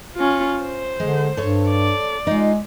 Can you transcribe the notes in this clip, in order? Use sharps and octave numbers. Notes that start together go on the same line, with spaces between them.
C#4 F4
C5
D3 G#3
G2 A4 C#5
D5
G#3 D#4 F4